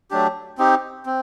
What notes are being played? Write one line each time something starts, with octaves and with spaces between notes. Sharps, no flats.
F#3 A3 D4 G4
C4 D#4 G4
C4